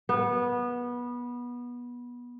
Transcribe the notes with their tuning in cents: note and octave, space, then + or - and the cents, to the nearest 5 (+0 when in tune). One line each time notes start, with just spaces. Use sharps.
B3 -20